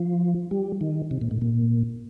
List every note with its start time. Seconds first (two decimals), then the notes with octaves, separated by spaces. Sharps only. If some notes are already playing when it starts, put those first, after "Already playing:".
Already playing: F3
0.51 G3
0.81 D#3
1.11 C3
1.21 A#2
1.31 A2
1.41 A#2